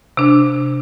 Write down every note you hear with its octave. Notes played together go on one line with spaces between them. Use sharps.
C3 D4